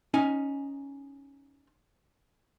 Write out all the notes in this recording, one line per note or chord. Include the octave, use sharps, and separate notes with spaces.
C#4 D#4 G#5